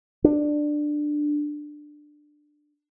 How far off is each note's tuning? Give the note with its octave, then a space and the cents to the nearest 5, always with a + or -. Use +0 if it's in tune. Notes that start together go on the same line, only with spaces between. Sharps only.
D4 +15